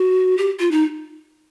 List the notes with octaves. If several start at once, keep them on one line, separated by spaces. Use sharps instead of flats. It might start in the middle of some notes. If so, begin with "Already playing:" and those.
Already playing: F#4
G4
F4
D#4